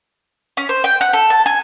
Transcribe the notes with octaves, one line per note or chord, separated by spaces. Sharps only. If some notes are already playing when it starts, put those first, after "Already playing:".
C#4
C5
G5
F#5
A4
A5
G#5